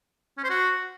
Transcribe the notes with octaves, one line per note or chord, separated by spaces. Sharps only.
C#4
C5
F#4